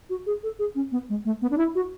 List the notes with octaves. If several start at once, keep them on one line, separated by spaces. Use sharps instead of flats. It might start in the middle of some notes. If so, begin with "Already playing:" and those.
F#4
G#4
A4
G#4
C#4
B3
G#3
A3
B3
D4
E4
F#4